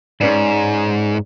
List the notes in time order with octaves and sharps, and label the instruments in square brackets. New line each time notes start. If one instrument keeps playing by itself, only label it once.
[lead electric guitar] G#2 [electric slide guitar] C#4 B4 D5